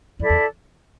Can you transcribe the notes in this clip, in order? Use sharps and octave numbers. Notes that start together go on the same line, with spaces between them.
F2 E4 A4 D5
E2